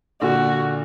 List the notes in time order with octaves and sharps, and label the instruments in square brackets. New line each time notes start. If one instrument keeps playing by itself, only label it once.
[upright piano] A#2 D3 [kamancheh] F#4